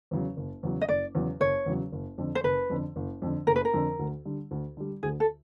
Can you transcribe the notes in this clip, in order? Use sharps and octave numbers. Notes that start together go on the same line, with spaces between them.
E2 C#3 F#3
F#1
E2 C#3 F#3
D#5
F#1 D5
E2 C#3 F#3
F#1 C#5
E2 C#3 F#3
F#1
F2 D3
C5
F#1 B4
F2 D3
F#1
F2 D3
F#1 A#4
B4
A#4
F2 D3
D2
D3 G3
D2
D3 G3
D2 G#4
A4